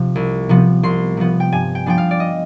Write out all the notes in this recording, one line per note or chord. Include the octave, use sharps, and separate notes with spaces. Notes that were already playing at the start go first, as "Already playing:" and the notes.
Already playing: C3 F3
C2
C3 F3 B3
C2 C6
C3 F3 B3
G5
G2 G#5
G5
F3 B3 D4 G5
F5
D5
D#5